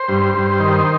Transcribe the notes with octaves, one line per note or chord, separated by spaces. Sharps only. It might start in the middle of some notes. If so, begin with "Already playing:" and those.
Already playing: C5
G2
G2
D#3